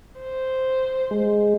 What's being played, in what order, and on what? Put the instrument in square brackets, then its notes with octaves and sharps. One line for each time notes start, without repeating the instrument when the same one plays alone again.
[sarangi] C5
[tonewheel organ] G#3